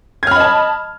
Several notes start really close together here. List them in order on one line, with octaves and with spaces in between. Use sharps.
G#6 F6 B5 D#5 A5